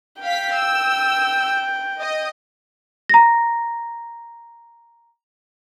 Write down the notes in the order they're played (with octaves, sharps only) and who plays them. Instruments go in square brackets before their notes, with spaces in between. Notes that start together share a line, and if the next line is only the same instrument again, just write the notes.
[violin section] F5 B6 [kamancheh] G5
[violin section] E6
D#5
[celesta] A#5 A#6